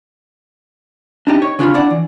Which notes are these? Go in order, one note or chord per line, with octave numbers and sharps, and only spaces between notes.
D4 D#4 G4
C#5
C#3 D4 F4 C#5 B5
D4 E4 D5 F#5
E3